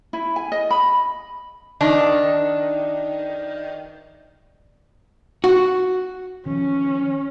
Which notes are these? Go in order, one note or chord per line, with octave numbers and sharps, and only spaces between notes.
E4
G#5
D#5
B5
D#3 D4
F#4
D#3 F3 C#4